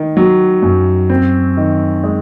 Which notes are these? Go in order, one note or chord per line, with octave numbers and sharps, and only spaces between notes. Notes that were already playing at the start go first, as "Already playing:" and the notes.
Already playing: D#3
F#3
F#2
C4
D#3
G#3